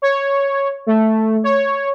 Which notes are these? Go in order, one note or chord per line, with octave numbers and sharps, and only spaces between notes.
C#5
A3
C#5